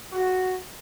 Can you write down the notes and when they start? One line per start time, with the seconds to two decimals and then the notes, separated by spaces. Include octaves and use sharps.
0.12 F#4